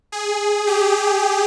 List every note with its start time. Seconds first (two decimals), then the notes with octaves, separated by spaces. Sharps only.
0.12 G#4
0.67 G4